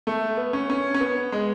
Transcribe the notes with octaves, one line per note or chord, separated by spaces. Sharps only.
A3
B3
C#4
C#4
C#4
B3
G#3